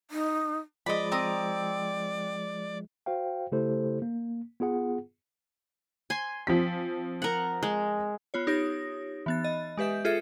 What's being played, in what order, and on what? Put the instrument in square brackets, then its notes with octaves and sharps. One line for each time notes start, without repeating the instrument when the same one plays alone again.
[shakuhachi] D#4
[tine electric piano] F3 G#3 [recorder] D5 [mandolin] D#5 B5
[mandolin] C4 A#5 D#6
[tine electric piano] F#4 C5 F5 G5
C#3 A3 E4 G4 A4 C5
A#3
B3 F4 G#4 F#5
[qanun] G#5 C6
[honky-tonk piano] F3 C4 B6
[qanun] A#4 F#5
G#3
[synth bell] B3 F4 C#5
D#4 G4 C#5 D#6 A#6
E3 B3 A6
D#5
G#3 G4 B4 E5 G6
F4 G#4 A4 E5 C#7